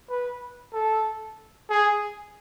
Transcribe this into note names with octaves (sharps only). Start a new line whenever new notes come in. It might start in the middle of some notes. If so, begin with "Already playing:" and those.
B4
A4
G#4